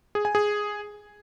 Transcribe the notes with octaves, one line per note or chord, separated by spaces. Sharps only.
G#4
G#5
G#4